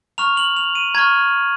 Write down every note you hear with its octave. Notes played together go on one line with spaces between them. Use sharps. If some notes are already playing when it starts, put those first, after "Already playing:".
A#5 C#6 F6 F7
F#7
F7
D#7
A#5 C#6 F6 G#6